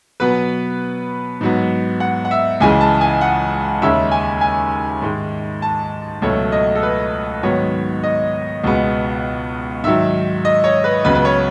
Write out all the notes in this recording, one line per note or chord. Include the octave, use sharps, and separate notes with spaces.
B2 F#3 B3 B4
G#2 F#3 B3
F#5
F#5
E5
C#2 C#3 E3 G#3 G#5
A5
G#5
F#5
D#2 C#3 G#3 C#4 E5
G#5
G#5
G#2 D#3 G#3
A5
C#2 B2 F#3 A3 C#5
D#5
A4
B4
G#2 D#3 F#3 B3 C#5
D#5
C#2 B2 G#3 B3
G#2 D#3 F#3 E5
D#5
C#5
B4
C#2 C#3 F#3 B3 B4
B4
C#5